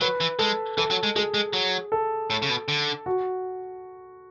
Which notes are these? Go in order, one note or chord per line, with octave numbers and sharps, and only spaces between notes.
F#3 B4
E3
G#3 A4
E3 A4
F#3
G#3
G#3 G#4
G#3
F#3
A4
A2
C#3
B2
D3
F#4